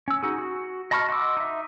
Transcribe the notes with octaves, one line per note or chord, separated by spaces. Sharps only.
C#4 E6
D#4 F#4 G#4
F#4
D#5 A5 B5 C#6 F6
F#4 D#5 C6 D6 E6
D#4 E5